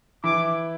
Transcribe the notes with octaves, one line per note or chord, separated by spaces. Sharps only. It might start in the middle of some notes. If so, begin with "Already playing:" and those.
E3 E4 D6